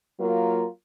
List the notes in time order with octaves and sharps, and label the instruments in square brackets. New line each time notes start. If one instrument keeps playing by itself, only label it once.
[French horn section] F#3 A#3 F4 A#4